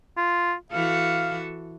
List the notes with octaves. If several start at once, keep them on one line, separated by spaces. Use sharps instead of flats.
F4
E3 F#4 A4 F5